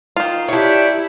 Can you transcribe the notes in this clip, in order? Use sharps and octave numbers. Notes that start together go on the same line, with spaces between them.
D#3 F4
D4 E4 G4 C#5